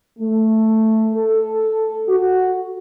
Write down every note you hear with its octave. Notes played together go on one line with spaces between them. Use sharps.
A3
A4
F#4